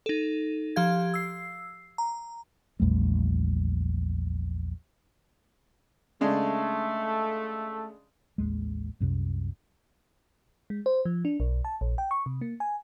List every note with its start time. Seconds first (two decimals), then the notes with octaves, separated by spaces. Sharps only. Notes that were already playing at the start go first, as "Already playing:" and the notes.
0.06 D#4 A4
0.76 F3 G4 F5 G#6
1.14 E6 C7
1.98 A#5
2.80 A#1 E2 G3 A3
6.21 C#3 G#3 A3 D4
8.38 A1 D#2 G#3
9.00 C2 F#2 C3
10.70 G#3
10.86 C5
11.05 F3
11.25 D4
11.40 B1
11.65 A5
11.81 A#1
11.98 G5
12.11 C#6
12.26 C3
12.41 A#3
12.60 G#5